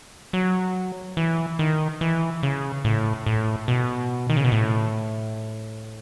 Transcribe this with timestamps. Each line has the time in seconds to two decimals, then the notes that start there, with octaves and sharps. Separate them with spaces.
0.33 F#3
1.17 E3
1.59 D#3
2.01 E3
2.43 C#3
2.85 A2
3.26 A2
3.68 B2
4.30 D#3
4.37 C#3
4.44 B2
4.52 A2